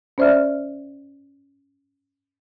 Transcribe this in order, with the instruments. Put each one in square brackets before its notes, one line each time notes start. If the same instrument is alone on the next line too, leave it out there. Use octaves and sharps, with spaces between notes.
[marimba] C#4 C5 D5 E5 F6